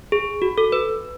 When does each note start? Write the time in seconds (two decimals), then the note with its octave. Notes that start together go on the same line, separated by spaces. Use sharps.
0.12 G#4
0.42 F#4
0.58 A4
0.72 B4